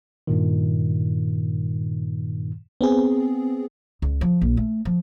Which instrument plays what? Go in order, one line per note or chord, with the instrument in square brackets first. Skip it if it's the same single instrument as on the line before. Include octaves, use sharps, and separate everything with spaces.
[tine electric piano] G2 A#2 D#3
[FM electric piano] B3 C4 G#4
[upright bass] C#2
F3
A#1
A3
F3